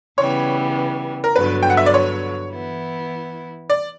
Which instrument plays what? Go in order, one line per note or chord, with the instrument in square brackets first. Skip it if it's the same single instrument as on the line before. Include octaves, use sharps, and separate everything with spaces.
[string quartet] C#3 E3 G3 B3 [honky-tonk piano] C#5
[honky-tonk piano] A#4
[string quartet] G2 D3 F#3 B3 [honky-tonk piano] B4
[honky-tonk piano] G5
F#5
E5
D5
C#5
[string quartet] E3 B3 E4
[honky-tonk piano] D5